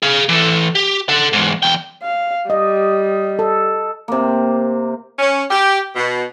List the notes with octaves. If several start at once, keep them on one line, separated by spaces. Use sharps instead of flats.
G#4 F5
E3 A4
G4
A4 F#5
E2 G#2
E2 G5
F5
G3 D#5
A4
C3 A#3
C#4
G4
B2